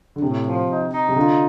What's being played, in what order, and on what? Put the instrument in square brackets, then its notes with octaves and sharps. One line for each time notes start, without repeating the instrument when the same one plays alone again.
[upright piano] D3
[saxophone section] A2 [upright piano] C3
[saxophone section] F3
D#4
D#4
[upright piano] C3
[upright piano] D3 [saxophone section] F4